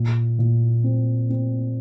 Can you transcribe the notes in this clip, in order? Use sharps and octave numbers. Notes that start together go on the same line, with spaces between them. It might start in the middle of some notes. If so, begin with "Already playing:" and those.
Already playing: A#2
A#2
C4
C4